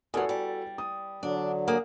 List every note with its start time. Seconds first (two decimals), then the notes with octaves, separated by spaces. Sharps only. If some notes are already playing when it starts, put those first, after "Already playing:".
0.14 E2 F#3 F#4 A4 G#5
0.29 G3
0.78 D#6
1.23 D3 F#3 D4
1.68 A#3 G#4 F#5